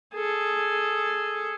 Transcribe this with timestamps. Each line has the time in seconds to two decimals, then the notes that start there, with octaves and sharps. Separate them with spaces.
0.14 G#4 A4